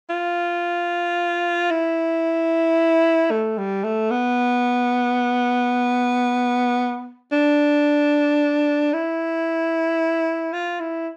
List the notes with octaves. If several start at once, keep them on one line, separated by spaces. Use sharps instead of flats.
F4
E4
A3
G3
A3
B3
D4
E4
F4
E4